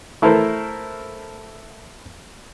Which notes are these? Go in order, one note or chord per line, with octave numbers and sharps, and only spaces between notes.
A3 E4 A4 A#4 C5